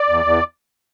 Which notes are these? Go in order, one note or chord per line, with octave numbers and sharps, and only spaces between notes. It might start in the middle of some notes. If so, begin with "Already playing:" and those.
Already playing: D5
E2
E2